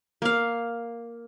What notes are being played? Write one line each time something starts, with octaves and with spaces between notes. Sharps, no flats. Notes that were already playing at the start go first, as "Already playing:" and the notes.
A#3 F5